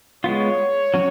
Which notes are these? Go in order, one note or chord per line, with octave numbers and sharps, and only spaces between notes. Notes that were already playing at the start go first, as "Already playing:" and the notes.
G#3 B3 F4 C#5
F#3 C#4